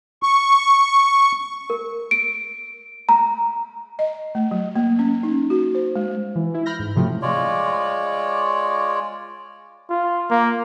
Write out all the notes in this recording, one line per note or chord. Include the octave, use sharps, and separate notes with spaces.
C#6
A#4
D7
A#5
D#5
A3
F#3
A#3
C#4
D#4
F#4
C5
G#3
E3
E4
B5 F6 G6 A#6
G#2
A2 C3 F3 F#3 A3
G#3 F4 C#5 D5
F4
A#3